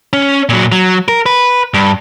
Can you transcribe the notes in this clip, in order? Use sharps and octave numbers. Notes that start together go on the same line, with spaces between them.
C#4
A#2 F#3
F#3
A#4
B4
G2